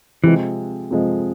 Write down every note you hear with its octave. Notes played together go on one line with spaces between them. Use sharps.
C3 E3 F3 G#3
C3 F3 G#3